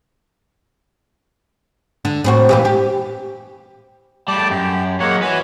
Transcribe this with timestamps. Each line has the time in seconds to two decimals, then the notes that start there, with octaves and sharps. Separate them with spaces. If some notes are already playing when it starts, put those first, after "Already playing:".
2.05 D3
2.24 A2 C4 F#4
2.49 A#2 E3 G4
2.65 G4
4.28 G3 A3 D5 A5 D6
4.50 F#2 G4
5.00 F#3 G#3 A#3 C#5 F#5
5.22 F#4 B4 C#5 E5 G#5